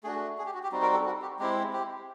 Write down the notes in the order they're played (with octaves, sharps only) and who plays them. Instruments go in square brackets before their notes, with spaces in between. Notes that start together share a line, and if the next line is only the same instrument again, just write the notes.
[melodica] A3 D4 F#4 G#4
G#4
G4
F#4
G4
G3 C4 D#4 F#4
A#4
A4
F#4
G4
G#3 C4 E4 G4
G4